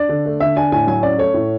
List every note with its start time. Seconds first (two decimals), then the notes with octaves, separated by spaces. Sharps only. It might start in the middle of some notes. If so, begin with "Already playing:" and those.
Already playing: D4 D5
0.09 D3
0.26 A3
0.40 D3 E5
0.56 D4 G#5
0.72 A2 G#5
0.87 F#3 G#5
1.03 C#4 D5
1.18 A3 C#5
1.34 A2